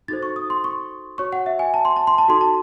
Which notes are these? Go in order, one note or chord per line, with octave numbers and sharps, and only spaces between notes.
D#4 F#4 A4 C5 A6
C#6
D#6
C6
C#6
F#4 C#5 C#6
F#5
E5
G#5
A5
C6
A5
C6
A5
D#4 F#4 A4 C6
A5